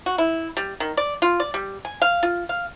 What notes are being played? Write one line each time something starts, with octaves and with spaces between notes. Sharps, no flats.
F#4
E4
G3
D#3
D5
F4
D5
G3
G#5
F5
F4
F5